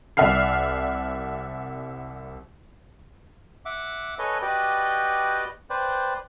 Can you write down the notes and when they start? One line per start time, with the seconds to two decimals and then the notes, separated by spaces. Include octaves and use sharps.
0.17 C2 D5 E5 F#5 F6 C7
3.66 E5 F#5 D6
4.19 A4 B4 C#5 D#5 G#5
4.42 F#4 G4 B4 D5 D#5 G5
5.70 B4 C5 D5 G5